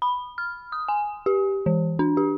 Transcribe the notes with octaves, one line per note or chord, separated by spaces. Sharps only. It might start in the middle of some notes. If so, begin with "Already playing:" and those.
B5
F6
D#6
G#5
G4
E3
D4
G4